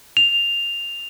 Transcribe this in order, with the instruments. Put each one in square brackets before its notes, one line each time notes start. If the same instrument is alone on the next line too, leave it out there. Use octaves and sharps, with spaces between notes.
[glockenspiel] F7